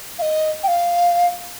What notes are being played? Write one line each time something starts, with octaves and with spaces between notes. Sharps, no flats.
F5
D#5
G5
F5